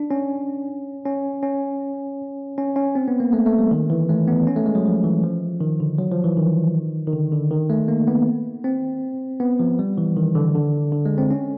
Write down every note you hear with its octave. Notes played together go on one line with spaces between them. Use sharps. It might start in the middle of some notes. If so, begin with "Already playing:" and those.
Already playing: D4
C#4
C#4
C#4
C#4
C#4
C4
B3
A#3
A3
A3
G3
D#3
E3
A3
B3
C#4
A3
G#3
F#3
F3
E3
F3
D#3
D3
F#3
F3
E3
D#3
D#3
D3
D3
D#3
A3
A#3
B3
C4
B3
F3
G3
E3
D#3
D3
D3
D3
G#3
C4
C#4